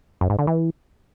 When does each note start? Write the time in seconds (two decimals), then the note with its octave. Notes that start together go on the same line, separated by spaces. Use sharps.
0.21 F#2
0.30 G#2
0.39 D3
0.47 E3